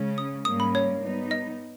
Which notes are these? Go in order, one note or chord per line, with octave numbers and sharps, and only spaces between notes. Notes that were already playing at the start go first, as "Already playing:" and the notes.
Already playing: C#3 G#3 C#4
D#6
G#2 G3 A#3 C#4 D#6
B5
C#5
G3 B3 D#4
D#5